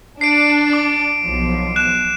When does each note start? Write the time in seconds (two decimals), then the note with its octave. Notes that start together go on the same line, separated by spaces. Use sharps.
0.21 D4 C7 D7
0.73 D6
1.22 B1 F3
1.76 F#6 E7